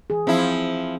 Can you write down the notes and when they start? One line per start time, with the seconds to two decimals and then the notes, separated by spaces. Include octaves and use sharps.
0.10 E3 G#4
0.27 F3 C4 E4